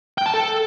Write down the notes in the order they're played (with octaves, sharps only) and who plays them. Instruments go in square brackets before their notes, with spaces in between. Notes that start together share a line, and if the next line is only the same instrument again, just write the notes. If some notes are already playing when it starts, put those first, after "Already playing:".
[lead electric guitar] G5
A5
A4